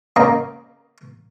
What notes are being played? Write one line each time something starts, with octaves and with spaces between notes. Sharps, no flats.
C#3 A#3 D#5 A#5